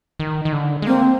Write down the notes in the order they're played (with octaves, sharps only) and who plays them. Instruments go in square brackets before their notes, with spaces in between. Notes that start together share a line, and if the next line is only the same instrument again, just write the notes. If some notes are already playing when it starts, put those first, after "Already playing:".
[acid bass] D#3
D#3
D3
G#3
[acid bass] A#3 [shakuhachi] C4